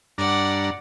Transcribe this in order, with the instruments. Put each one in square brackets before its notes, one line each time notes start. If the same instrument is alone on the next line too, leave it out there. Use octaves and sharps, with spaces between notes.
[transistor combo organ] G2 D4 A#5 [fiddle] D5 F#5